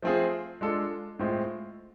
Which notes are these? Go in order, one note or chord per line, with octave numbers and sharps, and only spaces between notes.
F3 A3 C4 F4 G#4
G#3 D4 F4 A4
A2 G#3 C4 F4